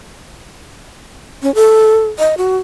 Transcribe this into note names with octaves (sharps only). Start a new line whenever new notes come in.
C#4
A4
D#5
F#4